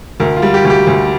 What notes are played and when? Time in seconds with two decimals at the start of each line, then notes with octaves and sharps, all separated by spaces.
0.20 D2 A#4
0.37 F4
0.42 G3
0.54 G4
0.65 D2
0.70 G4
0.87 D2